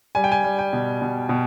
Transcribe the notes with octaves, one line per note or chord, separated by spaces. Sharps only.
G3 G#5
G5
G#5
G3
G5
B2
B2
B2